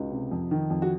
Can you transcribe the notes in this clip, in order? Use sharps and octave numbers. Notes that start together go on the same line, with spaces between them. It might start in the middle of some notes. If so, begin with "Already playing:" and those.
Already playing: C#2 D#4 F#4
C3
F2
D#3
F2
F#4